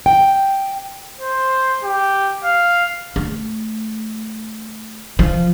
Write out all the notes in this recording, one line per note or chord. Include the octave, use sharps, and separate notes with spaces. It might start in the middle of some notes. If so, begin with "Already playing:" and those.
G5
C5
G4
F5
A3
F3